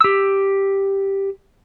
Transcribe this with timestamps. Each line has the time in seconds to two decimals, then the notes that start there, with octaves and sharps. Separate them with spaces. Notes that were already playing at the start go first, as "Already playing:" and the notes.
0.01 G4 E6